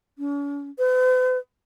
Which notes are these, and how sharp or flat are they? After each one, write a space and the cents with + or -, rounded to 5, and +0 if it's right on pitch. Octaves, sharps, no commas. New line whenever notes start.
C#4 +45
B4 +45